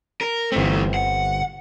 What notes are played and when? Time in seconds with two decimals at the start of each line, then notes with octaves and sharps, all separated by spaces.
0.21 A#4
0.52 G1 E3 A3 C4
0.94 F#5